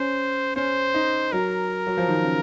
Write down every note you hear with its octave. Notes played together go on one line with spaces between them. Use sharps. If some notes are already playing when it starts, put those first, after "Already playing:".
Already playing: C#4 C5
C#4 C5
D#4
F#3 A#4
F#3
F3
D#3
C#3